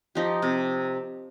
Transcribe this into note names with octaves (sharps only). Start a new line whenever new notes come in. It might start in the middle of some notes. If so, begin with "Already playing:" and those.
F3 D#4 G4
C3